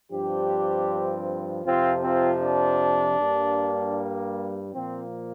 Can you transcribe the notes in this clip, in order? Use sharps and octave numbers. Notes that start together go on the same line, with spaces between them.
G2 F3 C4 D4 G4
F2 C3 F3 C4 F4
C4 F4
D4
G2 G3 A#3
A#2 F3 A#3 C4